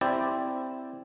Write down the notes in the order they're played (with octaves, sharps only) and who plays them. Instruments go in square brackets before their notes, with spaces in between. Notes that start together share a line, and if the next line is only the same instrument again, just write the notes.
[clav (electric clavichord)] C4 E4 G4 D5